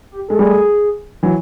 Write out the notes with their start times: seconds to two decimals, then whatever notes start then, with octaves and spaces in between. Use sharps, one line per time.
0.12 G4
0.29 G#3 A4
0.39 G3 A3 G#4
1.23 E3 F#3